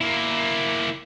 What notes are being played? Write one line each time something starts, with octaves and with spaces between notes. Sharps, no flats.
A#3 E4